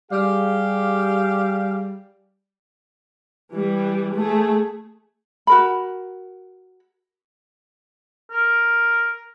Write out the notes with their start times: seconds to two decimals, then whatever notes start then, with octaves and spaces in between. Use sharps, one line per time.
0.12 G3 G4 G#4 F5
3.53 E3 G3
4.15 A3 G#4
5.47 F#4 A#4 B5
8.31 A#4